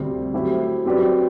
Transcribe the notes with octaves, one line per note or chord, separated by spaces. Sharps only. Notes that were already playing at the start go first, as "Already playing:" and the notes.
Already playing: D2 C3 G3 C4
F#3 A3 E4 G4 C5
F#3 C4 G4 B4 D5